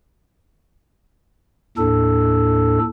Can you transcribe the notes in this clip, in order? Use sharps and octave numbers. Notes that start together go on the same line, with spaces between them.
D#2 A2 D4 A4